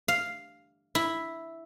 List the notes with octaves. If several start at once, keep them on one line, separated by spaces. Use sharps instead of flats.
F5
E4